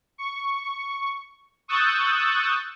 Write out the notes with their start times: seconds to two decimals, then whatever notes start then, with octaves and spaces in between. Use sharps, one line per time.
0.18 C#6
1.68 C#6 D#6 E6 F#6 G6 A6